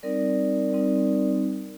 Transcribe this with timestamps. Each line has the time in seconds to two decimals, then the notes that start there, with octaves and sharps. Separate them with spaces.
0.03 G3 C4 D#4 A#4 D5
0.72 G3 C4 D#4